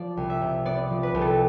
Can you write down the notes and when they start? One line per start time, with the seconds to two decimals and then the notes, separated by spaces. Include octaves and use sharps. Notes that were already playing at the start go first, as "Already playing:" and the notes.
Already playing: F3 D5
0.17 C2
0.30 E5
0.42 C3
0.65 B3 D5
0.90 F3
1.03 B4
1.14 C2
1.21 A4